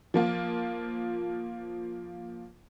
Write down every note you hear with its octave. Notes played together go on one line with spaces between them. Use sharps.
F3 A#3 F4